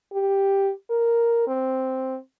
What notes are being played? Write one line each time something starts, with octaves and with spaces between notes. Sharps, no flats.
G4
A#4
C4